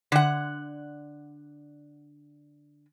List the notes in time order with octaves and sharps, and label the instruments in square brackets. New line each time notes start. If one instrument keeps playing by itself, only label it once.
[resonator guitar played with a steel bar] D3 F#5